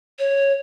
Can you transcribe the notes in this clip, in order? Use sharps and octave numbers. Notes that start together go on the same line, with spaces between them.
C#5